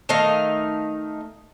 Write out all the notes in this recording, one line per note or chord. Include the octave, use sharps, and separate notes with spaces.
D#3 A3 D#5 F5